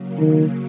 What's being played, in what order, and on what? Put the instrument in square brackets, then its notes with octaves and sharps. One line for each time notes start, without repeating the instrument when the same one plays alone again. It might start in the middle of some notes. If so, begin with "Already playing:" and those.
Already playing: [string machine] C#3 F#3 A#3
[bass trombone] D#3